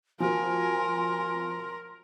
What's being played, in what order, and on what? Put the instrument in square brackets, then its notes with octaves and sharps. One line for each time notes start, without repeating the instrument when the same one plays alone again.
[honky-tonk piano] F3 F#4 [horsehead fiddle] A#4 [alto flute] G#5 [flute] C6